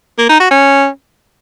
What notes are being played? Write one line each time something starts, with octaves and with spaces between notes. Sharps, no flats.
A#3
D#4
F#4
C#4